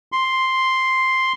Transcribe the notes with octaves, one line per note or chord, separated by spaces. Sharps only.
C6